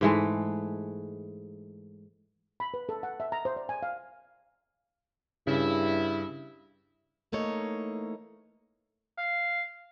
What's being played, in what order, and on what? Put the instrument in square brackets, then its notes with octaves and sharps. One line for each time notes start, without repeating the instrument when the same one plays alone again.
[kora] G#2 E3 G#3 A3
[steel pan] B5
B4
A4
F#5
E5
A#5
C5
D5
G#5
F5
[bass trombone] G2 [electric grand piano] C#3 [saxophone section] E4
[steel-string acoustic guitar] E3 A3 A#3 D#4 C#5
[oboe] F5